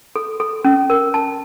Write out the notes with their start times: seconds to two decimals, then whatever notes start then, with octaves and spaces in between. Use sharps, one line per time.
0.16 A4
0.40 A4
0.65 C#4
0.90 A#4
1.14 A5